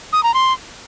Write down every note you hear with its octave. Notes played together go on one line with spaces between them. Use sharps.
D#6
A#5
C6